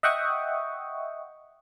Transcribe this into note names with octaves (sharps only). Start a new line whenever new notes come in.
D#5 E5 F#5 G5 C#6 D#6